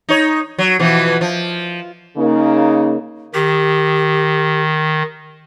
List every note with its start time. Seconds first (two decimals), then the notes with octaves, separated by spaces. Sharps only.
0.09 D#4 C#5
0.58 F#3
0.79 B2 E3 F3
1.21 F3
2.17 C#3 A#3 D#4
3.34 D#3 G4